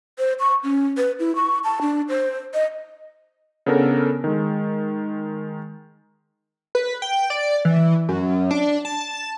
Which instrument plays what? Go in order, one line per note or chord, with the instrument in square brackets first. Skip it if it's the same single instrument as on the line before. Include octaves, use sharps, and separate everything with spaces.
[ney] C5
C#6
C#4
B4
E4
C#6
A5
D4
C5
D#5
[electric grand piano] C#3 B3 D4 A4 A#4
D#3 G#3
[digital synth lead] B4
G5
D5
E3
F#2
D4
A5